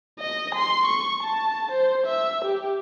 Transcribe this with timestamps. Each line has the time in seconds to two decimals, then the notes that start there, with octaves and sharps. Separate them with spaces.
0.19 D#5
0.54 C6
0.86 C#6
1.23 A5
1.71 C5
2.06 E5
2.44 G4